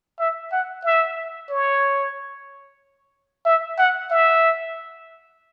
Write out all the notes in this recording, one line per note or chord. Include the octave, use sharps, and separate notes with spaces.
E5
F#5
E5
C#5
E5
F#5
E5